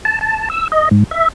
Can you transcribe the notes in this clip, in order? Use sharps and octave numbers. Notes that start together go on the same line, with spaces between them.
A5
A5
E6
D#5
G#2
E5